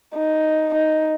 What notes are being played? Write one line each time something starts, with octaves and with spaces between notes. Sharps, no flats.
D#4
D#4